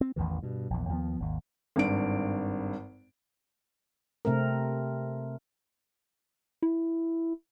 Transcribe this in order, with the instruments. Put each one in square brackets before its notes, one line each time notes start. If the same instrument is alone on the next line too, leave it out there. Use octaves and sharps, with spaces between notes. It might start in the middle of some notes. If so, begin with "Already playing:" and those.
[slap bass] C4
A1 E2 D#3 E3
G2 B2
A#1 E2
D#2 F3 F#3 B3
G#1 D#2
[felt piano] G#1 G2 D7
[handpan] C3 A3 C4 A#4
[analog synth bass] E4